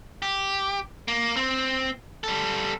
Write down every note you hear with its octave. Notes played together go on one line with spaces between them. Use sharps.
G4
A#3
C4
G3 A4